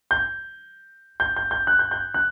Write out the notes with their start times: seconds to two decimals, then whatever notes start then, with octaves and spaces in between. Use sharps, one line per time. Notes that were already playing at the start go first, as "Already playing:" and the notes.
0.11 G6
1.20 G6
1.36 G6
1.51 G6
1.67 F#6
1.79 G6
1.91 G6
2.14 F#6